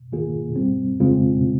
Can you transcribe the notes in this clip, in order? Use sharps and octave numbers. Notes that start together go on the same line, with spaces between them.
G#2 D#3 A#3 F4 G#4
G2 G3 C4
F2 C#3 G#3 C4 F4